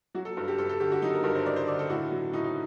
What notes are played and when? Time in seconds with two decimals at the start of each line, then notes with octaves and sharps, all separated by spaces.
0.15 F#3 F#4
0.25 A4
0.37 G2
0.48 G4
0.58 G2 A4
0.69 A4
0.80 D3 G4
0.92 F#4
1.02 F#3 D#4
1.09 A4
1.13 A#4
1.24 G2 A#4
1.35 C5
1.46 G2 D5
1.56 C5
1.68 D3 D5
1.79 A4
1.90 A2 F#4
2.12 F#3
2.33 A2 D#4
2.44 D#4